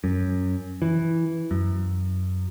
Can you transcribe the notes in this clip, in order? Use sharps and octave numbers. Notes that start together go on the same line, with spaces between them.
F#2
E3
F#2